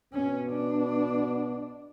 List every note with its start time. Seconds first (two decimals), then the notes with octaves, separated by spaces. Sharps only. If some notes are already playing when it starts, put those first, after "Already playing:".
0.13 B2 B3 C#4
0.51 D4